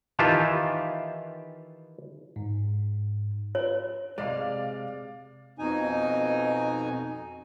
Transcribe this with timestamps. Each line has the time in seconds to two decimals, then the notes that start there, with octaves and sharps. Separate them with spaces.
0.19 D#3 E3 F4 G4 A5
2.36 G#2
3.55 F4 B4 C#5
4.18 C3 G#3 D5 F5 D6
5.59 F2 B2 D#4 G#5